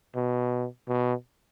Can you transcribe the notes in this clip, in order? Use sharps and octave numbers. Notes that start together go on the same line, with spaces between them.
B2
B2